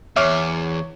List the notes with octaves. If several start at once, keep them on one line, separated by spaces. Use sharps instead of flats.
E2 C#5 E5 D6 F6